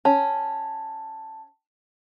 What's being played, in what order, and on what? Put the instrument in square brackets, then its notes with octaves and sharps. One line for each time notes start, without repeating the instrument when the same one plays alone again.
[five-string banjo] C#4 [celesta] G5 A5